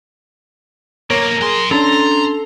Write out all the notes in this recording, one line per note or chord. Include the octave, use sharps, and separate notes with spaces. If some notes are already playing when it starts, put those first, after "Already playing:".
B1 A#3 A#4 C#5
F#3 G#4 C6
C#4 D4 A4 A5 A#5 C6